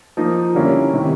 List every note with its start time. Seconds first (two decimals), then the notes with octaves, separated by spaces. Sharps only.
0.17 F3 A#3 D#4
0.54 D3 G3 A#3 C#4 E4
0.93 C3 D#3